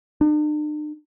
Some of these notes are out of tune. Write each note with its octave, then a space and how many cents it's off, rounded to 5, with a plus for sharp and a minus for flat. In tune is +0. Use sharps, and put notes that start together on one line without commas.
D4 +45